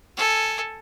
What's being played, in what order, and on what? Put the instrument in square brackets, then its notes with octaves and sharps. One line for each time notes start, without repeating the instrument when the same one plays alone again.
[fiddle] A4 G#5